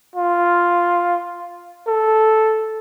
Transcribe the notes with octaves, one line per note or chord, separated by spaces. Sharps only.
F4
A4